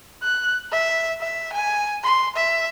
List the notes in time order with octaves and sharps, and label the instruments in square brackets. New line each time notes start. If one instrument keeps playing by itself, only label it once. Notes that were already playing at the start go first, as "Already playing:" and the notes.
[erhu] F#6
E5
E5
G#5
C6
E5